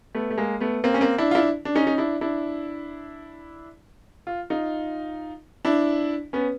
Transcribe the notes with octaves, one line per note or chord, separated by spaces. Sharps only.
A3 B3
A3
G#3 A#3
A3 B3
A#3 C4
C#4
A#3 C4
D4 E4
F4
D4 E4
D4
C#4 D#4
D#4
D4 E4
D4 E4
F4
D#4 F4
D4 E4
B3 C#4